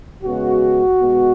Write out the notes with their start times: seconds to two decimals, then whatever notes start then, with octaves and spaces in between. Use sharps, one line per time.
0.22 C#3 G#3 B3 F#4
0.97 B2 G#3 B3